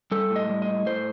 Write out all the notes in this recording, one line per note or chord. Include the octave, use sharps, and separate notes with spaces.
G3 A4
A2
D#5
G3
D#5
A2
A2 C5